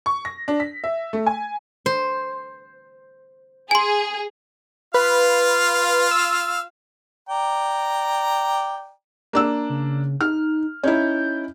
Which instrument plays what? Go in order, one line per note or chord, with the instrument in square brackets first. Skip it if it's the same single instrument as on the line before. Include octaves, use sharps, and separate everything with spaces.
[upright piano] C#6
A#6
D4
B6
E5
A3
G#5
[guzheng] C5
[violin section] G#4 [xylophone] G#5 C6
[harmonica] F4 F5 [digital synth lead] B4
[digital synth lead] E6
[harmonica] D5 G5 A#5
[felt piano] A#3 D4 E6
[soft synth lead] C#3
[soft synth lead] D#4 [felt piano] F6
[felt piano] C#4 D#4 E4 [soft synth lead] G6